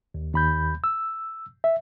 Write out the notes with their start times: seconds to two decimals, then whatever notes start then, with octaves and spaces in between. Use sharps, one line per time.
0.14 D#2
0.34 D#2 B5 G6
0.84 E6
1.64 E5